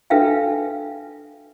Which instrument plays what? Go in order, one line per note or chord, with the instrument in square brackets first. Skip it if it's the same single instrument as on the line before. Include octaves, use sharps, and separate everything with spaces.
[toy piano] D4 A4 B4 E5 F5 G5